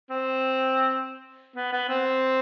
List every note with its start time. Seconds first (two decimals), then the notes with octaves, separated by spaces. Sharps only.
0.10 C4
1.56 B3
1.73 B3
1.89 C4